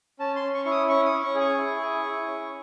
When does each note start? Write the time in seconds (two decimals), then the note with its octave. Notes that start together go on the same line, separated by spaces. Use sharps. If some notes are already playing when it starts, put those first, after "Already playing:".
0.19 C#4 A5
0.36 C6
0.42 C#4
0.54 C#6
0.65 E4 C#6
0.71 D#6
0.89 C#4 C#6
1.05 D#6
1.12 C#4
1.24 C#6
1.35 G#4
1.40 C#6
1.58 E4
1.81 G#4
2.04 E4
2.27 C#4